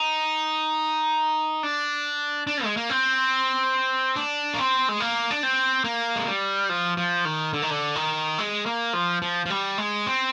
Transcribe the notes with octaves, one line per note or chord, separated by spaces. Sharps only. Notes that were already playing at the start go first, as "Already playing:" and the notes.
Already playing: D#4
D4
D4
G#3
A#3
C4
D4
A#3
C4
G#3
A#3
D4
C4
A#3
G#3
G3
F3
F3
D#3
D3
D#3
D3
D#3
G#3
A#3
F3
F3
F3
G3
G#3
C4